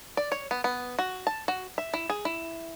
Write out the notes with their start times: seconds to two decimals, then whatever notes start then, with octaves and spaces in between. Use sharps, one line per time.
0.17 D5
0.32 C#5
0.51 B3
0.64 B3
0.99 F#4
1.27 A5
1.48 F#4
1.78 E5
1.94 E4
2.10 G#4
2.25 E4